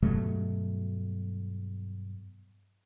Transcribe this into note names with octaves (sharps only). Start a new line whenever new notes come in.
G2 B2 F#3 A3